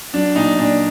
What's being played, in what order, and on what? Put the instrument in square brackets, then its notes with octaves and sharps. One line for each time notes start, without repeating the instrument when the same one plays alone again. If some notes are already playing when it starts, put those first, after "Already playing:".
[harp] F#3 [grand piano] D4
[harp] A#2 [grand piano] D#4
[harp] A#2 [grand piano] D4